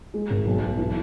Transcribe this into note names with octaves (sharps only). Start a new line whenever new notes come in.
G#3
G#1
B1
B1
E3